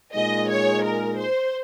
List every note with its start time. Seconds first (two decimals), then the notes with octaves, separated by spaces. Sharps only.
0.14 A#2 G#3 D#4 G#4 D#5
0.49 C#5
0.84 A#4
1.19 C5